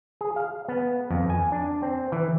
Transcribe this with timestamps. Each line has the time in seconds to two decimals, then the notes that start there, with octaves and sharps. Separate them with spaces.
0.21 G#4
0.36 F5
0.68 B3
1.11 F2
1.30 G#5
1.52 D4
1.82 C4
2.12 E3